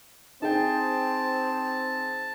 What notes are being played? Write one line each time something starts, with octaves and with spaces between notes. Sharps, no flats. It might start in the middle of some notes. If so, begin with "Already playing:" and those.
C4 D#4 G#4 G5 A5